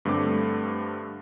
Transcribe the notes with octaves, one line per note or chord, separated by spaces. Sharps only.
G2 D3 A3 C4 D6